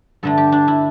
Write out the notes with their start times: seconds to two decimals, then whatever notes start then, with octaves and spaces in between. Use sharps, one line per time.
0.23 G2 D3 A3 A4
0.38 G4
0.52 D4
0.68 E4